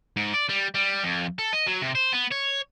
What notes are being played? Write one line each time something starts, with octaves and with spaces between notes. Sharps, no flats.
G#2
D5
G3
G3
F2
A4
D#5
F#3
C3
C5
B3
C#5